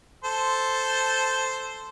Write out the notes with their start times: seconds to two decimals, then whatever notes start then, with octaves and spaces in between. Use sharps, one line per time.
0.24 A4 C5